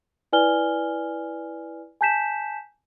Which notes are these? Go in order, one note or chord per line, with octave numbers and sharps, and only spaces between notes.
E4 B4 D5 G#5 F6 G7
G#5 A5 G6 B6 E7